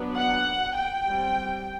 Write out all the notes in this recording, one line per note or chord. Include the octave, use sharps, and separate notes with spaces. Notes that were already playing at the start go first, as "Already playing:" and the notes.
Already playing: F#3 B3 D4
F#5
G5
G3 C4